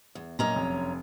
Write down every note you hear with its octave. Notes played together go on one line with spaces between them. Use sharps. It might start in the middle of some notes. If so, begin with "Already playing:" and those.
E2
F#2 A#2 C#4 D#5 A#5
F1